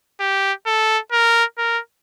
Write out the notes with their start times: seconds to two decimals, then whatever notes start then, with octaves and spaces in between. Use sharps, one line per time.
0.20 G4
0.66 A4
1.12 A#4
1.58 A#4